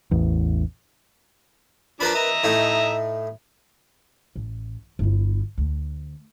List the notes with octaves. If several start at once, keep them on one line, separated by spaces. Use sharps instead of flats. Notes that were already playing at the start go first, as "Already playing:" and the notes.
A1 E2
F3 D4 A#4 B4 B5
D#5 E5 A#5
A2 A3 D#4
A1
G1 E4
D2